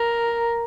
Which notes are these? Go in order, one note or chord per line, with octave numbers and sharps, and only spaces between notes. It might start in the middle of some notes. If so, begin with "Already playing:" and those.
Already playing: A#4